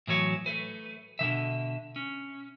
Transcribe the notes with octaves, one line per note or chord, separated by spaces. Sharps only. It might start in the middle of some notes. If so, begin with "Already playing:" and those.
A2 E3 F#3 C#5
A3 B4
B2 D3 D#3 E5
C#4